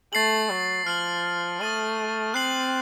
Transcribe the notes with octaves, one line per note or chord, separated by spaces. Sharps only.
A3 A6 C7 F#7
F#3
F3 F6 C7 F#7
A3 D#6 A6 D#7 F#7
C4 F#6 C7 F#7